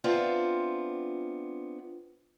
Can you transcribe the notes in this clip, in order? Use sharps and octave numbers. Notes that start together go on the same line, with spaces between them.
B3 C4 D4 F4 E5